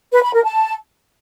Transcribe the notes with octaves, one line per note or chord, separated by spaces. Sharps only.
B4
B5
A#4
A5